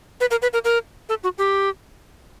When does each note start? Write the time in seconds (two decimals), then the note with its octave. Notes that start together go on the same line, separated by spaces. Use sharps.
0.20 B4
0.31 A#4
0.42 B4
0.53 A#4
0.64 A#4
1.09 A4
1.23 F#4
1.38 G4